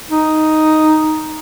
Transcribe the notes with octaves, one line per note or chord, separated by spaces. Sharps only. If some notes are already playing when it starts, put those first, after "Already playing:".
D#4